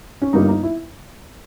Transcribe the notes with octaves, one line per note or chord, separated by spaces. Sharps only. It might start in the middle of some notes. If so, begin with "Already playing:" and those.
C#4
G1 G2 G3 A#3 D#4
D#4
E4